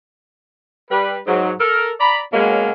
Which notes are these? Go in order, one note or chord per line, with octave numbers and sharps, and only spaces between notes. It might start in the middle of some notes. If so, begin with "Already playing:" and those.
G3 B4
G#2 F#3
A4 A#4
D5 A#5 B5
B2 F#3 G#3 A#3 C#4